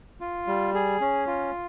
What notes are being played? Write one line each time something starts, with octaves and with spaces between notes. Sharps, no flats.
F4
G3
G#4
C#4
F4